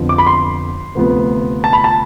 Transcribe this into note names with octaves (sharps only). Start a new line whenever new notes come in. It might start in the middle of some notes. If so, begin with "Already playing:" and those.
Already playing: F2 D3 F3 B3
D6
B5
C6
D2 C3 F3 B3
A5
B5
A5